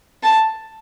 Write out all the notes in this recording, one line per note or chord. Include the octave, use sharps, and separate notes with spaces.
A5